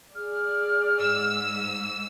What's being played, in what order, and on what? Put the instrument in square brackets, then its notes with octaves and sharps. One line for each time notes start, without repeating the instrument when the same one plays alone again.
[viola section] G#4 D5 [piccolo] F6
[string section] G#2 E6